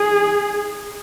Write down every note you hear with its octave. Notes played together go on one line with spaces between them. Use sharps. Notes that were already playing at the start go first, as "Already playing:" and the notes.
Already playing: G#4